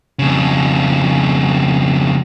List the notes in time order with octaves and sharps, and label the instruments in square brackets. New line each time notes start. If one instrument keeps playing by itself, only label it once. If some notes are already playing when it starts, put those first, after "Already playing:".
[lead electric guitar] F2 C#3